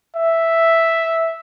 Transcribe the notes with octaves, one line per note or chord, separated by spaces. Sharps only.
E5